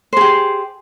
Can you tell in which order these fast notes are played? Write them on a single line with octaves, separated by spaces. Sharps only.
C5 G#4 G4